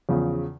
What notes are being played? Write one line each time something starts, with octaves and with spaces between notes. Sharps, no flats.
E2 C#3 F3